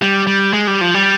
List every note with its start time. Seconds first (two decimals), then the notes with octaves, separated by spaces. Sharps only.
0.02 G3
0.27 G3
0.53 G#3
0.67 G3
0.81 F3
0.94 G3